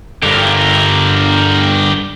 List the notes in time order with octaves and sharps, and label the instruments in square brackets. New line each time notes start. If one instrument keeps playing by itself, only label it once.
[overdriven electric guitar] G2 D3 [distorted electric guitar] G4 A#4